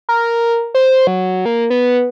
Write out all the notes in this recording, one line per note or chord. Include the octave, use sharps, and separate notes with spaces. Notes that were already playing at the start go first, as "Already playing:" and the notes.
A#4
C5
F#3
A#3
B3